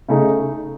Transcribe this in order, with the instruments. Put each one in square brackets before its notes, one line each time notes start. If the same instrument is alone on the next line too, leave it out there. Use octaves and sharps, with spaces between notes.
[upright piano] C#3 A3 D#4